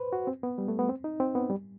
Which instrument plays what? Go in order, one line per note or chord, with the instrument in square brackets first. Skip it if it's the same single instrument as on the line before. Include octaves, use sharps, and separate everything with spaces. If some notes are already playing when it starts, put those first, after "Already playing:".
Already playing: [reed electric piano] B4 C5
F#4
C4
B3
G3
A3
B3
C4
D#4
C4
B3
G3